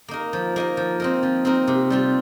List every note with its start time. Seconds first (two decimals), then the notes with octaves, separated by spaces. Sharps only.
0.08 A#3 D#4 A#4
0.33 F3
0.56 A#3 D#4 A#4
0.77 F3
1.00 C4 D#4 A#4
1.23 F3
1.45 C4 D#4 A#4
1.67 C3
1.90 G3 C4 F4